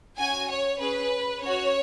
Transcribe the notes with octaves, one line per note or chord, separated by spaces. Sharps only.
C#4 F#4 G#5
C#5
C#4 G#4 B4
C#4 F#4 C#5